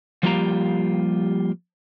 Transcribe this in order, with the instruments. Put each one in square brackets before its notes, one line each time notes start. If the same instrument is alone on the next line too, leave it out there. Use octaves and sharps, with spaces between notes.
[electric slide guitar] F3 G3 A#3 F4 G4 A#5